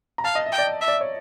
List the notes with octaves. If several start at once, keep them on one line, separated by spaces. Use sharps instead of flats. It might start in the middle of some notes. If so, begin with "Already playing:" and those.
A#5
F5 A5
D#5
E5
G5
D5
D#5
E5
D5
C#5